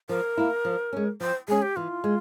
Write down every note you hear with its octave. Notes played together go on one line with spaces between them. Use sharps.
F3 A#4
A#3 E4
F3
G#3 C#4
F3 C5
G#3 C#4 G#4
G4
E3 F4
G#3